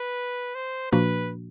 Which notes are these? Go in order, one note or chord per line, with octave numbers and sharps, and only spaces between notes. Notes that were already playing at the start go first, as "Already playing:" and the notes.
Already playing: B4
C5
A#2 F3 A#3 D4 F#4 B4